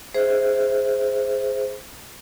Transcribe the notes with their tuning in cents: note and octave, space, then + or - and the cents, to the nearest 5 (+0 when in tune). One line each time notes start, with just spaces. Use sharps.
G#4 +0 C5 +0 E5 +0